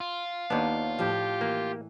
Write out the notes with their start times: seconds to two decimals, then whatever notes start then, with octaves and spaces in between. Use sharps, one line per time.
0.01 F4
0.50 D#2 B3 D4 D#4
0.99 A2 F3 G4
1.41 E3 A#3